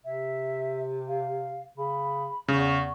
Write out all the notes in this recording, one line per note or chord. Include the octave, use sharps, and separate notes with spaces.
C3 E5
F5
C#3 B5
E2 C#3 C#6